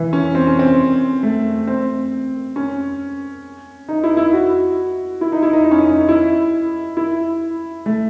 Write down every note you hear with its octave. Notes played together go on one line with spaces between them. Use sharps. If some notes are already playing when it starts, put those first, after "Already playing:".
Already playing: E3
C#4
C4
C#4
C4
A3
C4
C#4
D#4
E4
E4
F#4
E4
D#4
E4
D#4
D#4
C#4
D#4
E4
E4
A3